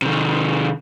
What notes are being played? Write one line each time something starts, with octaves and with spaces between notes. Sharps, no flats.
C3 D#3